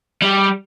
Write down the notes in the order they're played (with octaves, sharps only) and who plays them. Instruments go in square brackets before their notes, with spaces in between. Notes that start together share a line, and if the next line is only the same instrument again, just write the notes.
[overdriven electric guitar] G3